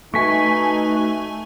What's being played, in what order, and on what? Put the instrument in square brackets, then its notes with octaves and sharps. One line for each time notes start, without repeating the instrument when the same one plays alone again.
[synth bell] A3 G#5 [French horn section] D#4 [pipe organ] F#4 B4 E5 [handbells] C#6 B6